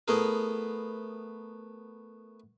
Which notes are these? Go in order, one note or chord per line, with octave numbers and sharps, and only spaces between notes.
A3 B3 E4 G#4 A#4